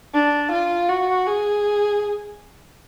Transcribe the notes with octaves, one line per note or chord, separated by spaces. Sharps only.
D4
F4
F#4
G#4